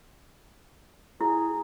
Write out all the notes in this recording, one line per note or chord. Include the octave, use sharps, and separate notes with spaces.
E4 G#4